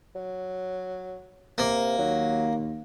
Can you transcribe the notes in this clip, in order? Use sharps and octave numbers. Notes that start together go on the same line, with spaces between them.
F#3
C3 A#3
D#2 F#3